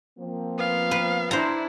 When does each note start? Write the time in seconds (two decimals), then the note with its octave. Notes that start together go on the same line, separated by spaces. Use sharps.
0.19 F3 A#3 C4
0.58 B3 F5
0.91 B4
1.31 D4 E4 C5 A#5